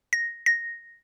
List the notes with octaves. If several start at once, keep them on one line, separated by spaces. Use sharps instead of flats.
A#6
A#6